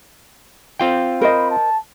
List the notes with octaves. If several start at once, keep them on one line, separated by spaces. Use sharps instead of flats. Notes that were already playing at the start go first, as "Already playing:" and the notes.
C4 F4 G5
A#4 C5 D#5 B5
A5